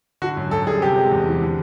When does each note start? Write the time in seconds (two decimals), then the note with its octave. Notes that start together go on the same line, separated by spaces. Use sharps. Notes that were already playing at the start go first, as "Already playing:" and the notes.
0.22 D3 F#4
0.37 F#2
0.51 F#2 A4
0.67 G3 G#4
0.82 C3 G4
0.96 G#3
1.11 E2
1.27 E3
1.41 D3